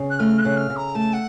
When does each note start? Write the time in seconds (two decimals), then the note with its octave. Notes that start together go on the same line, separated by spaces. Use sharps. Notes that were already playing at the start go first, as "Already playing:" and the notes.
Already playing: C#3
0.10 F#6
0.19 A3 F6
0.39 F#6
0.45 C#3
0.57 F6
0.70 C#3
0.76 A#5
0.95 A3 A5
1.13 F#5